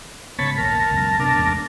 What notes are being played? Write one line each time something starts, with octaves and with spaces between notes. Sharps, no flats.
G#2 C#3 B3 C#5 A5 B5
A#1 D#2 A#4 A5
C#2 F#2 B2
C3 A#3 B3 D4 A#4
A1 E2 G#3